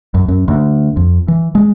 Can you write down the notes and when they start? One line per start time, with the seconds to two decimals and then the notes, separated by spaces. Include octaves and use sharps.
0.14 F#2
0.28 F#2
0.48 D2
0.97 F2
1.28 E3
1.55 G#3